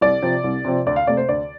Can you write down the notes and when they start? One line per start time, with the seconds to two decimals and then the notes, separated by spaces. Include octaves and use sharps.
0.01 C2 D5
0.22 C3 F3 C4
0.44 C2
0.65 C3 F3 C4
0.86 D2 D5
0.96 F5
1.07 C3 A3 D5
1.17 C5
1.29 D2 D5